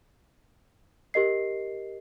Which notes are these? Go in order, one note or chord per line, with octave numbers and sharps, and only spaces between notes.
G4 A#4 D#5 C7